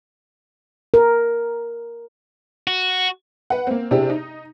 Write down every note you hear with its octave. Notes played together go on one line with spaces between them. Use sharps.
A#4
F#4
B4 F#5
A#3 C4
C3 D4 E4 G4 G#4
D#4